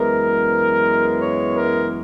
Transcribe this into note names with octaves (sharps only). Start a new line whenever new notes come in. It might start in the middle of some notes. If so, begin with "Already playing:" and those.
Already playing: F#2 E3 G#3 B3 A#4
C#5
A#4